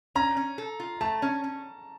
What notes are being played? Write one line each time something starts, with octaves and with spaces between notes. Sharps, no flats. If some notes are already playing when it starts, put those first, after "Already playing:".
C#4 A#5
C#4
A4
F4
A3 A5
C#4
C#4